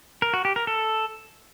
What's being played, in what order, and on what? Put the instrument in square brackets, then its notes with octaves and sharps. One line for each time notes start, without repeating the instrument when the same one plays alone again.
[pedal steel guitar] A#4
F#4
G4
A#4
A4